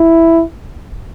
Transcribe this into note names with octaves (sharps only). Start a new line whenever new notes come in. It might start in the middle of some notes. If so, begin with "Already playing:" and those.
Already playing: E4